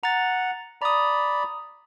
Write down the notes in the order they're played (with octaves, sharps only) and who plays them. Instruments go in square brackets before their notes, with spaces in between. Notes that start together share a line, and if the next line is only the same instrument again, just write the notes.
[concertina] F#5 [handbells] A#5 A6
[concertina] D5 B5 [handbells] A#5 D#6